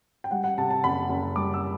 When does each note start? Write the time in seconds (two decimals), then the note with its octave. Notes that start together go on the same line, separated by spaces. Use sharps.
0.24 G5
0.31 G3 F#5
0.44 F#5
0.58 C3 A5
0.71 A5
0.84 F#1 B5
1.09 F#1
1.36 G3 D6
1.54 E6